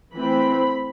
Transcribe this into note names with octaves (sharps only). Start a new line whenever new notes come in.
E3 A3 C4 B5